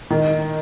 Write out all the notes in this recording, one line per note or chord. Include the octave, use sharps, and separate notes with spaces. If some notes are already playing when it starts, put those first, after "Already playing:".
D#3